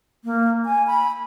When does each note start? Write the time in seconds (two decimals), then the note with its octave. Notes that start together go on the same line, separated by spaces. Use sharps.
0.24 A#3
0.66 G#5
0.87 B5